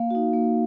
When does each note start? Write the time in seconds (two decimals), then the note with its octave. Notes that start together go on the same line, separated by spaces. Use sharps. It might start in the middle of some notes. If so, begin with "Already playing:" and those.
Already playing: A#3 F5
0.10 D#4 F#4
0.33 A#3